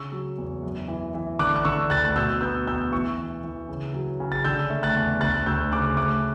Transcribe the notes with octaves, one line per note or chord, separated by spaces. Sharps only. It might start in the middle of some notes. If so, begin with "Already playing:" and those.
Already playing: C#3 C#6 E6
F#3
E2
F#2
E3
E3
D3 D6 F#6
F#6
D3 C#6 E6
D2 F#6 A6
A6
B2 E6 G6
B3 E6 G6
E2 E6 G6
E3 C#6 E6
E3
E3
C#3
F#3
C#3
A6
D3 E6 G6
A3
F#6 A6
E2
D2 F#6 A6
D2 E6 G6
C#3 D6 F#6
A3 D6 F#6